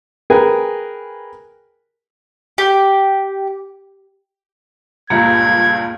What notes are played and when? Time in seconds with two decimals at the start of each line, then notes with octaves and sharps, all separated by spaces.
0.30 G#4 A#4 B4 G5 G#5
2.58 G4
5.10 C#2 G2 A#2 A#3 G#6